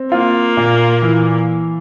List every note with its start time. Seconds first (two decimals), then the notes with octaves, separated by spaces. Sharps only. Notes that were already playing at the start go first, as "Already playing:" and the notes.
Already playing: C4
0.12 A#3 F4
0.57 A#2
1.02 E3